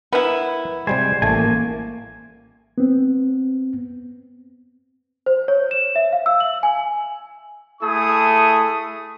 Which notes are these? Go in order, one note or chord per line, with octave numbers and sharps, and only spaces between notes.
B3 E4 A#4
C3 G3 G#3 C5 G#5
A1 A3 A#3 G#5 A5
B3 C4
C5
C#5
E7
E5
F5
E6
F#7
G#5
A3 E4 G#4 A4 C#6 D#6